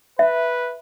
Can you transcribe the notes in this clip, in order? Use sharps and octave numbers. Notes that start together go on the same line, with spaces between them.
B4 E5